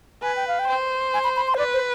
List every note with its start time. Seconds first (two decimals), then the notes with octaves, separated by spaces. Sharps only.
0.22 B4 G#5
0.36 G5
0.48 F5
0.59 G5
0.68 C5
1.14 G#5
1.24 B5
1.36 B5
1.48 C6
1.54 C5
1.58 B4 D5
1.74 C5